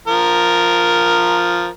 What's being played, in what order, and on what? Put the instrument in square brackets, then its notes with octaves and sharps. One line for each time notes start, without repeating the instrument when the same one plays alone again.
[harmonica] F3 A#4